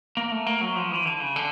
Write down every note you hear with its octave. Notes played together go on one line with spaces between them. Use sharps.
A#3
A3
A#3
F#3
F3
E3
D3
C#3
D3